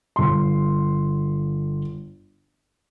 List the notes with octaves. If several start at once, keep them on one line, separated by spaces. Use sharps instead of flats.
G1 C6